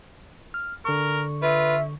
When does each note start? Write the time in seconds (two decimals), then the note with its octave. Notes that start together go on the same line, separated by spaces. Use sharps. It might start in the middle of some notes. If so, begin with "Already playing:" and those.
0.54 F6
0.85 D3 A#4 C#6
1.42 F4 B4 E5